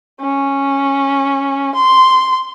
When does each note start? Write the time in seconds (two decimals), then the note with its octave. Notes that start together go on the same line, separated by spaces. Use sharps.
0.21 C#4
1.75 C6